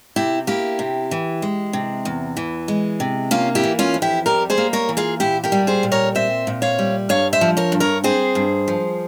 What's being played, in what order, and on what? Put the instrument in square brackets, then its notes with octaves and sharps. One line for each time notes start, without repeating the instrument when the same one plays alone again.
[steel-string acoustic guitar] C3 E4 G4
A#3 E4 G4
C3
E3
G#3
C3
E2
E3
G#3
C3
A#3 C#4 F4
E4 G4
E3
C#4 F4
F2
E4 G4
G3 G4 A#4
G#4 C5
A#3
A#4 C#5
E3
F4 G#4
A#2 E4 G4
G4 A#4
G3
G#4 C5
A#2
A#4 C#5
C4 C5 E5
A#2
C#5 F5
G3
G2 C#5 F5
C5 E5
F3
A#4 C#5
G2
A#4 C#5
C4 G#4 C5
G2
F3